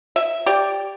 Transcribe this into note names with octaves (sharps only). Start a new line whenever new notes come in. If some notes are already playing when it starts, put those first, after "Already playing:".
E5
G4 D5